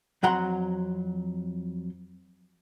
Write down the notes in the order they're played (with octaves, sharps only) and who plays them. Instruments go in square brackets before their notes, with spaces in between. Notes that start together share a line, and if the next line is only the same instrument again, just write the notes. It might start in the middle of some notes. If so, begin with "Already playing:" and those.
[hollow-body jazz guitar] F2 F#3 F#5 A#5 C6